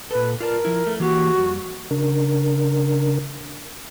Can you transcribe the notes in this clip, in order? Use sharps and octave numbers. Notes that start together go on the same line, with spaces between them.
A#2 A4 B4
F4 A#4 D5 A5
F3 E4
A3
E3 A#3 F#4 G4
F2 G3
C#3 D4 A#4